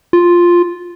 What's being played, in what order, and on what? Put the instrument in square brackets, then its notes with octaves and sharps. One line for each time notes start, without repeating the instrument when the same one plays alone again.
[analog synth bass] F4